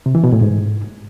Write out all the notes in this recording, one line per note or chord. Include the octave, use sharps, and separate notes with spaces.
C3
E3
B2
A2
G#2